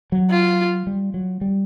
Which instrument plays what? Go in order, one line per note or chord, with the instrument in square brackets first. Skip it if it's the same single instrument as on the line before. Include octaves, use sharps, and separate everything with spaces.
[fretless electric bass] F#3
[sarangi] F4
[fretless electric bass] G3
F#3
G3